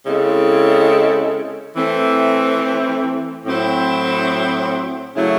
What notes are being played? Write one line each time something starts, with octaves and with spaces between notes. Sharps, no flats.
C#3 G#3 C4 E4 A4
E3 A3 C4 E4
A2 F#3 C4 E4 C5
C#3 F#3 A3 C#4 E4